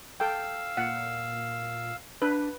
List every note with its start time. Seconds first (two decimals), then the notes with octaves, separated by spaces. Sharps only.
0.20 A4 F5 G5 E6
0.77 A#2 F#5
2.22 D4 B4